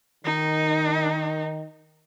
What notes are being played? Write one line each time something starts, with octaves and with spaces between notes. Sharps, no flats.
D#3 D#4